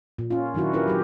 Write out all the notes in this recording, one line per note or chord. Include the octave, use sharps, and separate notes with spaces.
A#2
C#4 F4
D#3 F#3 D4 E4 F#4
C#4 E4 F4 G4 A#4 B4
F#3 G4